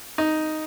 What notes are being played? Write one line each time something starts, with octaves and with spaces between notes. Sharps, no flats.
D#4